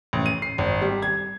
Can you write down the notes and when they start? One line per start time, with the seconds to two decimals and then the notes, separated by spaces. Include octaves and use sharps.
0.13 A1
0.26 D#7
0.42 C7
0.58 G#1
0.81 G3
1.02 G#6